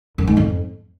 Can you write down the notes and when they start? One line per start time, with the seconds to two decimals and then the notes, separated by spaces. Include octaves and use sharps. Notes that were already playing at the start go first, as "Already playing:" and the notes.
0.18 F#2
0.27 G#2
0.37 F2